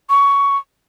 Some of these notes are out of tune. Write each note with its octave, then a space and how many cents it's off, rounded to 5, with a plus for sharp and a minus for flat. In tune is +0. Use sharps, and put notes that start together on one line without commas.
C#6 +15